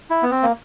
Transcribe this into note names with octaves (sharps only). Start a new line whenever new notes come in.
E4
B3
C4
A#3